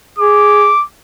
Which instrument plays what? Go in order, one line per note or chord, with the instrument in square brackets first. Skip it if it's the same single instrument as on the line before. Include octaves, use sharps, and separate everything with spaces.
[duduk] G#4 [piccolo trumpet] D6